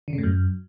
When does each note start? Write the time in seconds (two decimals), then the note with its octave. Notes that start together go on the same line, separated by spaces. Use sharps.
0.08 D3
0.13 C#3
0.18 A2
0.23 F#2